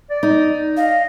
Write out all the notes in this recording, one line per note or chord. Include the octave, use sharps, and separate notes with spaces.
D5
D#4
D#5 F5